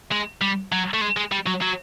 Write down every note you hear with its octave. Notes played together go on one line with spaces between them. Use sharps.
G#3
G3
F#3
A3
G#3
G#3
G3
F#3
F#3